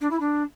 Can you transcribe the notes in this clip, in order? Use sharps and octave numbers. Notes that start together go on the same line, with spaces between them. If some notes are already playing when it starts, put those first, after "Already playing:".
D4
E4
D4